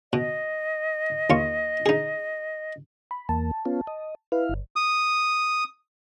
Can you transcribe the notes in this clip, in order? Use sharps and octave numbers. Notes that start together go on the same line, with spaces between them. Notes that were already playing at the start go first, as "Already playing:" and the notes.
B2 D#5
D#2 F4 C#6
D#4 G#4
B5
E2 A#3 A5
B3 C#4 F4
D#5
E4 B4 F5
G1
D#6